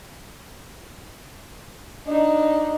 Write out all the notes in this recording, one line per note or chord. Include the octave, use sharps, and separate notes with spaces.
D4 D#4